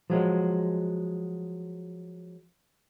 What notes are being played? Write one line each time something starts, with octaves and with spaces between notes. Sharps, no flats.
F3 F#3 G#3